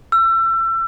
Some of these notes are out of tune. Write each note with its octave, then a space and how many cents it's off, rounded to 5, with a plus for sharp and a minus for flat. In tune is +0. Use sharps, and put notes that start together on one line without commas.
E6 +30